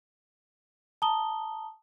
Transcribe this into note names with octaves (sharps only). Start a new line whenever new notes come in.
A5 A#5 D#6 G7